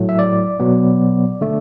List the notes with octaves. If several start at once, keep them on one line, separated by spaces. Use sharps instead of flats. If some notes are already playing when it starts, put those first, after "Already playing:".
Already playing: A2 F#3 A3
E5
D5
B2 F#3 B3
D3 A3